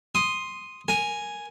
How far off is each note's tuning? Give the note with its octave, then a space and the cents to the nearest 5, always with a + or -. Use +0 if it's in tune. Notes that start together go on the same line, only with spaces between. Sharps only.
C6 +5 D#6 -5
A#4 +0 G#5 +0